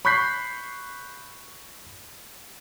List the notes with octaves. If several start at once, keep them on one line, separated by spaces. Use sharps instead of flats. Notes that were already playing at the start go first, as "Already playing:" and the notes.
B5 C#6 F#6 G6 B6 C7